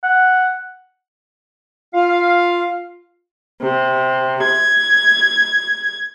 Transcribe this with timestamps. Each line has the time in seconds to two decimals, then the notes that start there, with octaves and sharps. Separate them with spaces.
0.04 F#5
1.94 F4 F5
3.62 C3
4.43 G#6